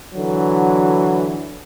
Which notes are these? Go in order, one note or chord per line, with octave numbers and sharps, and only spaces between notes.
D3 E3 F#3